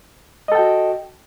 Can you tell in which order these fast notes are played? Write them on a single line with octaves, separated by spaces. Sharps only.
D#5 A4 G5 F#4